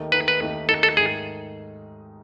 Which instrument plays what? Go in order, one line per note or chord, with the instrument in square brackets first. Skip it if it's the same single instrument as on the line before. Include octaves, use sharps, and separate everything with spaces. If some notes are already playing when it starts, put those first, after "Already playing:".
Already playing: [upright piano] D#2 D#3 A3 D#4
[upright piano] D#2 D#3 A3 D#4 [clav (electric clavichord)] B4
[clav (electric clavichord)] B4
[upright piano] D#2 D#3 A3 D#4
[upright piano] D#2 D#3 A3 D#4 [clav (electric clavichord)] A4
[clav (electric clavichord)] A4
[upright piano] G#2 D#3 A3 D#4 [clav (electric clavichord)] G#4